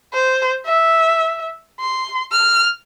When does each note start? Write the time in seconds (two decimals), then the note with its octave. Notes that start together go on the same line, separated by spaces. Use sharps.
0.13 C5
0.66 E5
1.80 C6
2.32 F6